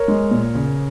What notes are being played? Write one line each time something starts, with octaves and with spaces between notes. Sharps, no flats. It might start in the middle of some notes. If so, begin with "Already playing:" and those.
Already playing: A#4 C#5
G#3
A#2
C#3